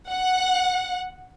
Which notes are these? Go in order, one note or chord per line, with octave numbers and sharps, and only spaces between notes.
F#5